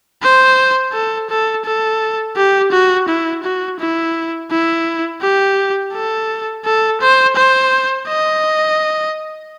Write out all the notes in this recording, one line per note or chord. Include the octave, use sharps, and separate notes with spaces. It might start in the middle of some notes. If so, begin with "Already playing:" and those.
C5
A4
A4
A4
G4
F#4
E4
F#4
E4
E4
G4
A4
A4
C5
C5
D#5